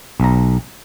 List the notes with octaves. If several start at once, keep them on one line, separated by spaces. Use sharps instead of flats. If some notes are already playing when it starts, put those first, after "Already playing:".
B1 A#5